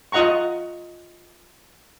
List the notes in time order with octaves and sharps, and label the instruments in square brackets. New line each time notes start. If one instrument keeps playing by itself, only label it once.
[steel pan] F4 D#5 F#5 A#5 C#6